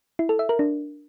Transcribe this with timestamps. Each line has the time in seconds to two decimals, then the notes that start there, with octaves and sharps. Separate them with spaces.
0.19 E4
0.29 A4
0.39 E5
0.49 A#4
0.59 D4